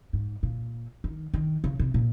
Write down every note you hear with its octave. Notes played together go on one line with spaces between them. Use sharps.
G#2
A#2
D#3
D#3
C#3
C3
A#2